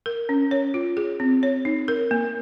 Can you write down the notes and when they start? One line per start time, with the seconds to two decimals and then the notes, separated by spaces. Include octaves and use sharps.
0.06 A#4
0.29 C#4
0.51 C#5
0.74 F4
0.97 G#4
1.20 C4
1.43 C#5
1.65 D#4
1.88 A#4
2.11 A#3